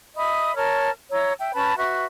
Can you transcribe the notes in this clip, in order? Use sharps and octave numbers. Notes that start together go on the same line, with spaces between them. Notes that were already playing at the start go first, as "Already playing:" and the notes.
D#5 E5 B5 D#6
A#4 C#5 A5 F6
E4 C#5 A#5 E6
E5 G5
C#4 B4 A5 B5
F#4 B4 E5 C#6